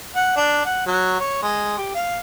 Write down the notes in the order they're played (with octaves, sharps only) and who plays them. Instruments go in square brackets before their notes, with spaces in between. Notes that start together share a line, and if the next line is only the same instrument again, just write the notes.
[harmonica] F#5
D4
F#5
F#3
C#5
G#3
G4
F5